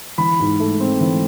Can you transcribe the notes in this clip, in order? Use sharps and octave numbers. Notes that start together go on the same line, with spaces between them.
E3 B5
G#2
A3
C4
E3